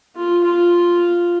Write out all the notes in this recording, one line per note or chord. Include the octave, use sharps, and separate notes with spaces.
F4
F4